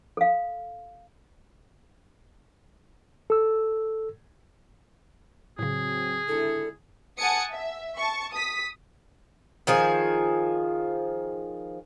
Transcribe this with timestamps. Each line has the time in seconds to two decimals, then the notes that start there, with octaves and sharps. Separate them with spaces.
0.17 A4 F5
3.30 A4 E6
5.59 A2 C#3 F#3 C4 G#4
6.28 G#1 D3 E4 A4
7.17 F#5 G#5 A5 D#6 C#7
7.51 E5
7.97 A5 C#6
8.33 D#6 B6
9.67 D#3 F3 G#4